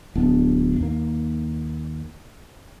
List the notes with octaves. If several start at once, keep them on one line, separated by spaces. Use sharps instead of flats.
D1 B3 D4
D#2 A#3